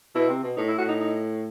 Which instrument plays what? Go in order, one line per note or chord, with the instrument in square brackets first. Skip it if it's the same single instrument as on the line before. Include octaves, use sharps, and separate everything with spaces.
[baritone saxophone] B2 [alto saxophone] E4
[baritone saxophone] C3
B2
[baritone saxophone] A2 [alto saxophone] D#4
[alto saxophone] E4
[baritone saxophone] A2 [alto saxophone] F#4
[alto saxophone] D#4
D#4